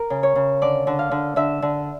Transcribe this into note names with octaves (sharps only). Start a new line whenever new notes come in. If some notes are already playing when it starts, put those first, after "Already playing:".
Already playing: A#4
C#3
C#5
C#3
D3 D5
D3
F5
D3
D3 E5
D3